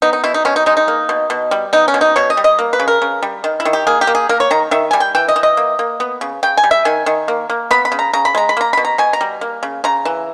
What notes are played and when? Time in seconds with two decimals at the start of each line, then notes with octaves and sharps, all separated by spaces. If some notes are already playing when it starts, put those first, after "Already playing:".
0.02 B3 D#4
0.13 D#4
0.24 B2 E4
0.34 D#4
0.45 B2 C#4
0.56 D#4
0.66 G#3 D#4
0.77 D#4
0.88 A#3
1.09 B2
1.30 B2
1.51 G3
1.73 B3 D#4
1.88 C#4
1.94 B2
2.01 D#4
2.16 B2 C#5
2.30 D#5
2.37 G3
2.44 D#5
2.59 A#3
2.73 B4
2.80 C#3
2.88 A#4
3.02 C#3
3.23 G3
3.44 D#3
3.60 E4
3.65 D#3
3.73 G4
3.87 A#3 G#4
4.01 G4
4.07 A#3
4.15 G#4
4.29 A#3 A#4
4.40 C#5
4.51 D#3 A#5
4.71 D#3 E5
4.91 G3 G#5
5.00 G5
5.15 E3 G5
5.28 D#5
5.36 E3
5.43 D#5
5.57 A#3
5.79 A#3
6.00 B3
6.21 C#3
6.43 C#3 G5
6.57 G#5
6.64 G3
6.71 E5
6.85 D#3 G#5
7.06 D#3
7.28 A#3
7.50 A#3
7.71 B3 B5
7.85 B5
7.92 C#3
7.99 A#5
8.13 C#3 A#5
8.25 B5
8.35 G#3 A#5
8.49 B5
8.57 A#3 A#5
8.73 B2 B5
8.85 A#5
8.98 B2 G#5
9.13 A#5
9.21 G3
9.41 A#3
9.63 C#3
9.84 C#3 A#5
10.05 E3